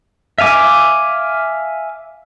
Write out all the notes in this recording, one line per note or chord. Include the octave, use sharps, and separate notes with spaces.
E5 F5 G#5 D6